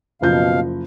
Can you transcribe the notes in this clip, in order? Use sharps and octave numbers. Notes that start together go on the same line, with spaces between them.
F#1 B2 F3 F5 G6